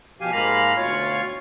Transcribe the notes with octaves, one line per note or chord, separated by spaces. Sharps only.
B2 F3 G4 F5 G#5
G#2 G#3 A#3 F5 A#5 B5
D2 B2 F4 C#5 F5 C#6